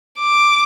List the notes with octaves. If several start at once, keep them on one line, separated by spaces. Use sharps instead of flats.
D6